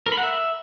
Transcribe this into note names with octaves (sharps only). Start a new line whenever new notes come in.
A#4
B5
F#5
E5